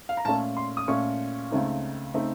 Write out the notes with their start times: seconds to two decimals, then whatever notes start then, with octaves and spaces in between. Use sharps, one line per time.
0.09 F5
0.17 A#5
0.25 A#2 A3 C#4 A5
0.57 C6
0.77 D#6
0.88 A#2 A3 C#4 C#6
1.51 C#2 C#3 A3 C4 D#4
2.14 C#3 A3 C4 D#4